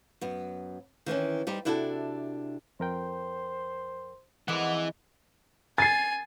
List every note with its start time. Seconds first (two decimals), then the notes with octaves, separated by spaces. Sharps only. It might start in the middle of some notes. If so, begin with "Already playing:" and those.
0.21 F#2 B3
1.06 D#3 E3 C4 C#4
1.47 G3 D#4 G4 C5
1.65 C3 D4 E4 F#4 G#4 A4
2.80 F2 A#4 C5 G5
4.48 F2 E3 G#3 B3 F#5 D6
5.78 G#5 A6 C7